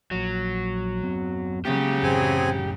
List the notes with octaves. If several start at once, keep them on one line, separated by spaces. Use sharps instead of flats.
A#1 F3 F#3
F#2 B3 C4
C#3 F#3 G#3 A#3 B3 G4
F#2 A2 E3 C4 G#4 G#5